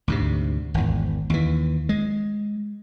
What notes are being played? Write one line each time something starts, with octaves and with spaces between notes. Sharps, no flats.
D2 G#2 C3
G#1 E2
D#2 E3
G#3